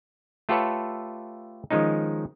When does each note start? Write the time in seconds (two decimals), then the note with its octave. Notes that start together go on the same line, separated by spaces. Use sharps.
0.49 A3 F4 G4 A4 B4 C#5
1.71 D#3 F3 G#3 C#4 D#4